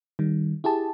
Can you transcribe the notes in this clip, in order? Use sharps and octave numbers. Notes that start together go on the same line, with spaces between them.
D#3 G3
E4 G4 G#4 A5